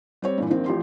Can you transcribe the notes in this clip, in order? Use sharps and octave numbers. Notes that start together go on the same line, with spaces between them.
G3 C4 C#5
G2 A#2 E3
A#1 D#3 C4
A1 F3 G4 C6